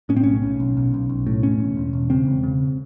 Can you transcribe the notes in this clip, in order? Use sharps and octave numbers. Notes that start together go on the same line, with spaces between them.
A2 C#4
C4
B1 C#4
B1
B1
B1
B1
B1
A2
E1 C#4
E1
E1
E1
C#3 C4
E1
C#3